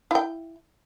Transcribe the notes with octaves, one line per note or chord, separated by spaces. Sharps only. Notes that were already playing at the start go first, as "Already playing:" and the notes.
E4 G5